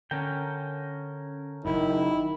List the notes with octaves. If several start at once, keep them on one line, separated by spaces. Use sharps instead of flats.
D3 C#4 A#4 G5
F#1 F#2 D#3 E4